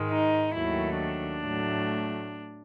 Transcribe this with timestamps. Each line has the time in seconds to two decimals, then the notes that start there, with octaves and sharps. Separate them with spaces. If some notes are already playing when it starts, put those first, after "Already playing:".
Already playing: G#2 D#3 G#3
0.09 D#4
0.53 D#2 D#3 F#3 A3 E4
0.98 D4
1.42 A2 F#3 A3